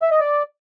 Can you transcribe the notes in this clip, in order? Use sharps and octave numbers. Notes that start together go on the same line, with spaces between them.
E5
D#5
D5